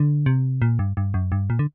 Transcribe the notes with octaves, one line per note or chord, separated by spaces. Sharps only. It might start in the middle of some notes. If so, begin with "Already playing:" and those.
Already playing: D3
C3
A#2
G2
G2
F#2
G2
A#2
D3